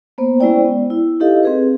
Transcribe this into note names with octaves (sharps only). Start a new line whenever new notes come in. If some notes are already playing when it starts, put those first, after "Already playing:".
A#3 B3 C5
G#3 C#4 E4 C5 D5 G5
B3
E4
D#4 E4 G4 A4 D#5 F5
C4 G#4 B4